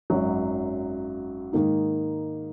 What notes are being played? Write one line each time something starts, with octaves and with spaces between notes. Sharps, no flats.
G#1 F#2 F#3
G#2 D#3 A#3 D#4